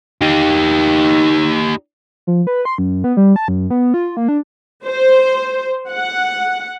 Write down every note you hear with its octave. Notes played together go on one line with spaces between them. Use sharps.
D#4 G4
F3
B4
C6
F#2
B3
G3
A5
F#2
B3
F4
A#3
D4
C5
F#5